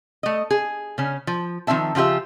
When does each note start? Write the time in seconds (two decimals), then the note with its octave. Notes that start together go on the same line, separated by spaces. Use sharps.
0.23 A3 D#5
0.51 G#4
0.98 C#3 C#4
1.27 F3
1.67 D#3 F3 C4 E5 A5
1.95 C#3 F3 F4 G4 E5